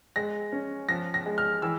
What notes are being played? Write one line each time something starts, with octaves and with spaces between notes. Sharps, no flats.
G#3 A#6
C#4
F3 A#6
A#6
G#3
F6
E3 E6